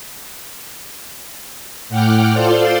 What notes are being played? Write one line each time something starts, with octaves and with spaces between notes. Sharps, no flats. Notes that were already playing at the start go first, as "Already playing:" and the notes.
A2 F#5 G5 D6 F6
F4 A4 C5 D5 F5 C6